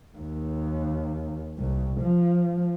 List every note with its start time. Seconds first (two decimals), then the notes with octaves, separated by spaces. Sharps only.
0.18 D#2
1.58 C2
2.01 F3